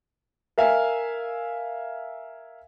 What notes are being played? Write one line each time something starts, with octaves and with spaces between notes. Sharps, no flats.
A#4 E5 F5 G#5